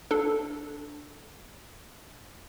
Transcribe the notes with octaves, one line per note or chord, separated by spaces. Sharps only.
D4 A4